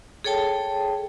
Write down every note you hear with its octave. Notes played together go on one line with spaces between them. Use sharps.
G#4 A4 C#5 G5 A5